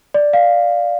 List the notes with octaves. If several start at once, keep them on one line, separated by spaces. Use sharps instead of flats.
D5
F5